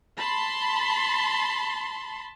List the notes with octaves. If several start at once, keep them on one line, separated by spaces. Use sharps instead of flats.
A5 B5 C6